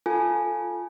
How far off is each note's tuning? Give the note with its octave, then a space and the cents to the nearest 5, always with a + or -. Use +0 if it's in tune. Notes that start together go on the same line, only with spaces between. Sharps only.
F4 +0 A4 +0 G#5 +0